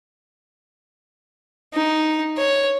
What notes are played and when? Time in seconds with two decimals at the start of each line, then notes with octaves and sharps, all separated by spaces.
1.74 D#4
2.37 C#5